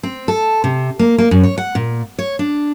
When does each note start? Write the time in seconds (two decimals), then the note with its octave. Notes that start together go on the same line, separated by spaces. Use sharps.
0.03 C4
0.28 A4
0.64 C3
0.99 A#3
1.18 A#3
1.31 F#2
1.43 C#5
1.58 F#5
1.75 A#2
2.19 C#5
2.39 D4